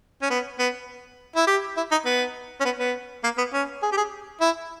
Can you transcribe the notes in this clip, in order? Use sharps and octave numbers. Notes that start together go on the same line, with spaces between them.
C#4
B3
B3
E4
G4
E4
D#4
B3
C#4
B3
B3
A#3
B3
C#4
G#4
G4
G#4
E4